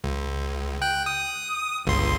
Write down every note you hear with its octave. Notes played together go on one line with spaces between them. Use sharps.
C#2
G5 F#6
D#6
G1 C#2 C6